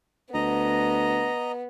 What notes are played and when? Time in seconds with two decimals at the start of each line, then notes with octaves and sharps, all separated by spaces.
0.34 D2 B3 D#5 A#5